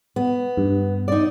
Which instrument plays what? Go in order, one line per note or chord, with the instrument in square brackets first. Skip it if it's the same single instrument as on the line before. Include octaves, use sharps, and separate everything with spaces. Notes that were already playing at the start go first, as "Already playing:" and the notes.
[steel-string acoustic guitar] B3
[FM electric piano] G2
[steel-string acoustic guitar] D#4 D5